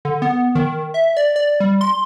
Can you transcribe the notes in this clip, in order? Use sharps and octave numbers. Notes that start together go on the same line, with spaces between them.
D3
B3
D#3
E5
D5
D5
G3
C6